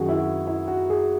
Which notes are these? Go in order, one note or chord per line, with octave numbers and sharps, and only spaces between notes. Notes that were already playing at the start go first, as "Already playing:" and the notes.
Already playing: F#2 D#3 F#4 G#4
E4
F#4
E4
F#4
G#4